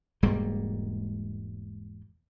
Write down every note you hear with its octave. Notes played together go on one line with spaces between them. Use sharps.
E1 G#2 G3 A#3